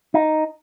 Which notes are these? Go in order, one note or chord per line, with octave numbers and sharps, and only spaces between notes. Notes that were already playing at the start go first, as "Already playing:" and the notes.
D#4